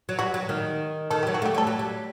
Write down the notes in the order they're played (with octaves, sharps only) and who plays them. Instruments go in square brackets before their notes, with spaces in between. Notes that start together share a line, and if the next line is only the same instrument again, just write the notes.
[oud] F#3
[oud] G3 [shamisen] F#4
[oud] F#3
D#3
[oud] D#3 [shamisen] A4
[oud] F#3 [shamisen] G4
[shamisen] F#4
[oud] A3 [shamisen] G4
[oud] G3 [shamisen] A4
[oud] F#3
G3